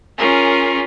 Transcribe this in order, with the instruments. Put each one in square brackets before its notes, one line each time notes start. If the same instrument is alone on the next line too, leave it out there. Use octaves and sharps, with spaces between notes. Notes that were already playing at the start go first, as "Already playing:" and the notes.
[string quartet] C#4 F4 G#4 A#4